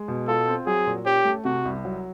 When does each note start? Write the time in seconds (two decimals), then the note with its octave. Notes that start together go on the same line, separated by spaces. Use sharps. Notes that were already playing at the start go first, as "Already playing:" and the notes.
Already playing: G#3
0.08 B2
0.28 F4 A4
0.48 C4
0.67 F#3 G#4
0.87 A#2
1.06 C#4 G4
1.25 A3
1.45 C3 F#4
1.65 C2
1.85 F#3